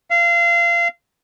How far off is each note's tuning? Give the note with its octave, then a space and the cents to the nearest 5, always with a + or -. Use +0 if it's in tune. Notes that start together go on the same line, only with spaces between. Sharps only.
F5 -25